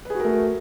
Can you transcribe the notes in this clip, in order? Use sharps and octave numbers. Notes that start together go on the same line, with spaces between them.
A3 F#4 G#4 A#4 B4